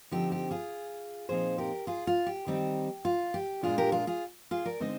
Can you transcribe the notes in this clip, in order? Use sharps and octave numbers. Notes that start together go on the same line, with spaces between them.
D3 F3 C4 D#4 G4
G4
F4 G#4
A#2 F3 C4 D#4 G#4 C5
G4 A#4
F4 G#4
F4
G4
D#3 G3 C4 D#4
F4
G4
A#2 G#3 D4 F4 G#4
G4 A#4
F4 G#4
F4 G#4
F4 G#4
A#4 D5
D3 G#3 C4 D#4 C5 D#5